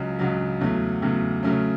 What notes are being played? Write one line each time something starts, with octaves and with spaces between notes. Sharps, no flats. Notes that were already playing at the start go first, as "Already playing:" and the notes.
Already playing: C#2 C#3 F#3
C#2 C#3 F#3
E2 C#3 F#3 A3
E2 C#3 F#3 A3
C#3 F#3 A3 C#4